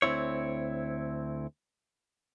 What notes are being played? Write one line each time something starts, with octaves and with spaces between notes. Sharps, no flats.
D2 C3 C4 E4 C#5